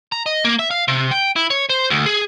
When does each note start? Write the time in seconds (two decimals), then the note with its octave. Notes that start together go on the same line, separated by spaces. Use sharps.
0.12 A#5
0.26 D#5
0.45 A#3
0.59 E5
0.71 F5
0.88 C3
1.11 G5
1.36 E4
1.50 C#5
1.70 C5
1.90 D2
2.06 G#4